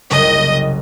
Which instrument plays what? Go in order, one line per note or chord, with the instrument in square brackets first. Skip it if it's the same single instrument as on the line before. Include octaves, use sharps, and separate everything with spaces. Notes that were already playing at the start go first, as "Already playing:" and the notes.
[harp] F#1 C2 [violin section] D#5